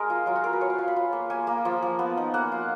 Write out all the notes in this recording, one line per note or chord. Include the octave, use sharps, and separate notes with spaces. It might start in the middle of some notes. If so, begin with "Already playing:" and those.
Already playing: G#3 G#4 A#4
F4
F#3 F4
F#4
F4 A#4
B4
F4 C#5
F5
F4 G#5
B5
F4
A#3
A#3 G#5
A#3
F3
F3
B3
D#4
A#3 F#5
F4